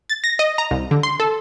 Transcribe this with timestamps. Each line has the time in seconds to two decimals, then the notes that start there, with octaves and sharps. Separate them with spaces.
0.10 A6
0.24 A#6
0.39 D#5
0.58 A#5
0.71 C2
0.91 D3
1.03 C6
1.20 A4